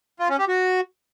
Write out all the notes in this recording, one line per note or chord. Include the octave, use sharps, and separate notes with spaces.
F4
C#4
G4
F#4